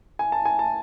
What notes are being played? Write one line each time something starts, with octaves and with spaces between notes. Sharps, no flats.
G#5
A5
G#5
A5